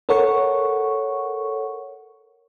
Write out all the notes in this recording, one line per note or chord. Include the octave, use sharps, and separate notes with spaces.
A4 A#4 C#5 F#5 C#6